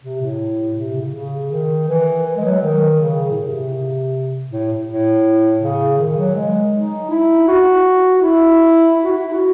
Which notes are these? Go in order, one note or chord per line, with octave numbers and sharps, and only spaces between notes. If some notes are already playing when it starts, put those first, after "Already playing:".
C3
A2
C3
C#3
C#3
D#3
E3
E3
G#3
F#3
D#3
C#3
A2
C3
A2
A2
C#3
D#3
F#3
G#3
D#4
E4
F#4
F#4
E4
E4
F#4
E4
E4
F#4